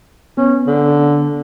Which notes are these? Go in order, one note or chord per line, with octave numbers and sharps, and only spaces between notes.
B3 C#4
D3